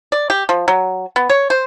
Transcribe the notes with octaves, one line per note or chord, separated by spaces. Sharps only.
D5
G4
F3
F#3
B3
C#5
C5